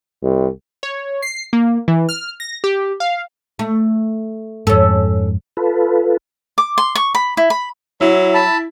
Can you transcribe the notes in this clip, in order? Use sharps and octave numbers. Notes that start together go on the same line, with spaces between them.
C2
C#5
C7
A#3
E3
F6
A#6
G4
F5
A3
F2 G#2 C#4 A4
F4 A4 B4
D6
C6
C#6
B5
E4
B5
F#3 E4
A5 B5